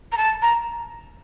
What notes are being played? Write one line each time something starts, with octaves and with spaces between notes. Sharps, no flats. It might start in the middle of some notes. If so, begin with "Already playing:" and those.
A#5
A5
A#5